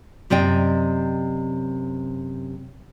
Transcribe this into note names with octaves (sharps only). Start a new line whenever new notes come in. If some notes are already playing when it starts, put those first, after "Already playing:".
F#2 C3 D5 D#5 G5